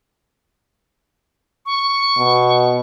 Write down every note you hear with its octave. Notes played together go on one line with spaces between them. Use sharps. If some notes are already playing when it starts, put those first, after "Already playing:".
C#6
B2